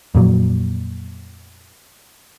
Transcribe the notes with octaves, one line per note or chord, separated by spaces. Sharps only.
F2 A#2 F#3